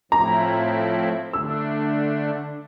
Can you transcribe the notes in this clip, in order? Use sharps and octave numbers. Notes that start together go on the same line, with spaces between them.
A2 F3 A3 C4 E4 A#5
D3 A3 D4 E6